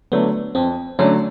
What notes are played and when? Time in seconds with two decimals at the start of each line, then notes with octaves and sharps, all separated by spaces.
0.12 D3 F#3 A3 B3 D4
0.55 F2 C4
0.99 D3 F#3 A3 C#4 D4